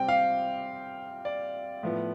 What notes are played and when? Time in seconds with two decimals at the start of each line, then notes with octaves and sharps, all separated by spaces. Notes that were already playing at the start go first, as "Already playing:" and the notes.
Already playing: C3 G3 C4 G5
0.08 F5
1.25 D5
1.83 A2 F3 B3